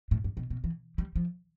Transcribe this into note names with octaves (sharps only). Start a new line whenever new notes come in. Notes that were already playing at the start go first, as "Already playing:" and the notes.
A2
G2
B2
B2
E3
G3
F3